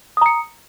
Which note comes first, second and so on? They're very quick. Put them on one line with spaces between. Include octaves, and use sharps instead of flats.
D#6 A#5 C#7